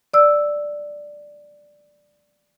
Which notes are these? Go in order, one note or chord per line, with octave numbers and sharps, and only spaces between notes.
D5 E6